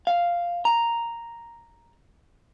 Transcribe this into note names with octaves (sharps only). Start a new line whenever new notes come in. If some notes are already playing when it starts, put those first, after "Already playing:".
F5
A#5